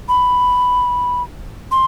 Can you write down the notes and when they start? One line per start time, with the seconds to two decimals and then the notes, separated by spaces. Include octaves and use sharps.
0.09 B5
1.72 C6